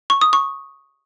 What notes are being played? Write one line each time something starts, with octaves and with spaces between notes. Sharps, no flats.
C#6
D#6
C#6